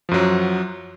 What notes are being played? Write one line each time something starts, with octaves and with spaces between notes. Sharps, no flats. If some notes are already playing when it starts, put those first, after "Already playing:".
F#2 F3 F#3